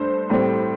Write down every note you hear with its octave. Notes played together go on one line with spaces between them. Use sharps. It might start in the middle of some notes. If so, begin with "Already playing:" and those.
Already playing: G2 A3 C5
A2 G3 C4